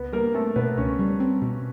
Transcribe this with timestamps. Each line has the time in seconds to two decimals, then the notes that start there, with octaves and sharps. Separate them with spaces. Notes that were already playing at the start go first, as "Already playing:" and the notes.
Already playing: C#2 B3 B4
0.13 G3 A#3 A#4
0.34 A3 C4 A4
0.56 B2 B3 B4
0.77 C#2 C#4 C#5
0.99 G3
1.20 C4
1.42 B2